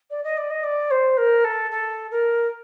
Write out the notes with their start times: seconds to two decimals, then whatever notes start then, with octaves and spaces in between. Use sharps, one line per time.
0.10 D5
0.24 D#5
0.37 D5
0.50 D#5
0.63 D5
0.91 C5
1.17 A#4
1.44 A4
1.71 A4
2.11 A#4